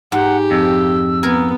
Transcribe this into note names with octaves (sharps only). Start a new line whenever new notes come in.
G#2 G4 F#5
F2 E6
B3 A#4 G#5